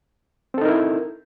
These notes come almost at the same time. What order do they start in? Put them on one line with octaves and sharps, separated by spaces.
C4 A4 D#4 A#4 E4